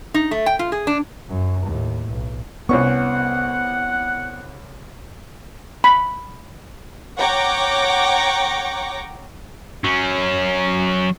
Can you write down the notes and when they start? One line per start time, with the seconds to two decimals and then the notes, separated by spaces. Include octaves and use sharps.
0.14 D#4
0.31 A3
0.46 G5
0.59 F4
0.72 G#4
0.87 D4
1.29 F#2
1.66 D#2 A2
2.10 B1
2.69 C2 B3 C#4 F#5 C#6
5.84 B5
7.17 C#5 F#5 G5 A#5 C#6 D6
9.84 F#3 C#4